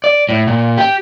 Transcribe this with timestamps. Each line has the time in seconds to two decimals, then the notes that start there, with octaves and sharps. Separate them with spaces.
0.04 D5
0.29 A2
0.47 A#2
0.77 G4